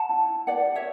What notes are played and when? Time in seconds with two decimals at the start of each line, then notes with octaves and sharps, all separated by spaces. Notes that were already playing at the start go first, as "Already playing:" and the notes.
Already playing: F#5 A5
0.09 E4
0.29 E4
0.47 B4 D5 F#5
0.66 G4
0.75 C#5 E5